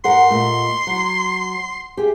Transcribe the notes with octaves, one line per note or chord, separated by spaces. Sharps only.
G2 A#4 F#5 C6
A#2 A3 D#5
F#3
G4 G#4 E5